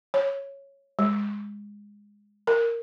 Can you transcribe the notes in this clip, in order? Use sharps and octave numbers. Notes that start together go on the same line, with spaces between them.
C#5
G#3
A#4